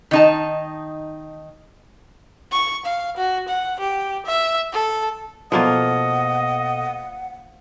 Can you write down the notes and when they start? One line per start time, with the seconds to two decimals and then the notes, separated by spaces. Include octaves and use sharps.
0.11 D#3 D#4 A5
2.52 C#6
2.85 F5
3.17 F#4
3.48 F#5
3.79 G4
4.25 E5
4.72 A4
5.52 B2 F3 A#3 F4 A4 D#5 F#5